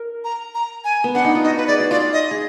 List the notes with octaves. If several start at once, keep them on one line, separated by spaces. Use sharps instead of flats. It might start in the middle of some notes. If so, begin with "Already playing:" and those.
Already playing: A#4
A#5
A#5
G#5
B3
D4 F#5
D#4
F4
F#4 D#5
B4
G#4 D5
F#4
F4 D5
D#5
G#4